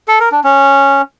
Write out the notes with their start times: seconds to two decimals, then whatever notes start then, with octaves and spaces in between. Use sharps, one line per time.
0.08 A4
0.20 A#4
0.32 D4
0.44 C#4